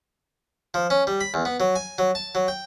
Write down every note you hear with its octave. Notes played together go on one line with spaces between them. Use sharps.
F3
C#4
G3
B5
E2
B3
F#3
G#5
F#3
A5
F#3
G5